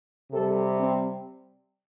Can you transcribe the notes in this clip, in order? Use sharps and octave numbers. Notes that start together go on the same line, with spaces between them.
C3 G3 A4
C4